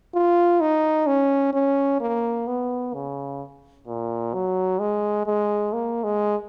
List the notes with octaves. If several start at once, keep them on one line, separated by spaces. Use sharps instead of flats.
F4
D#4
C#4
C#4
A#3
B3
C#3
A#2
F#3
G#3
G#3
A#3
G#3